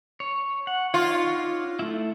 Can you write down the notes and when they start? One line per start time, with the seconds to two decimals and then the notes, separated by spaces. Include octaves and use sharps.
0.20 C#5
0.67 F#5
0.94 D4 D#4 F4 C#5
1.79 A3 E4